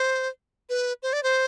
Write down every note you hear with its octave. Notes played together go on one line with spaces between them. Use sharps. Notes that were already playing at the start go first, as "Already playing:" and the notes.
Already playing: C5
B4
C5
D5
C5